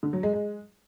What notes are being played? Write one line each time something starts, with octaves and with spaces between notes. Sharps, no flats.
D3
F#3
G#3
G#3